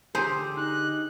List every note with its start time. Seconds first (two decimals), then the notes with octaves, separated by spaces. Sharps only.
0.15 D3 G4 G#4 C5
0.57 D#4 F#6